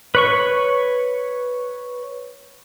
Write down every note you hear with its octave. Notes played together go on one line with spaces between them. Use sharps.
B4 C#5 C#6